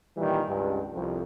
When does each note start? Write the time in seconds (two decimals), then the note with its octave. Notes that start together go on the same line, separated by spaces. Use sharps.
0.17 A#2 D#3 E3 G3
0.47 C#2 G2
0.93 C2 F2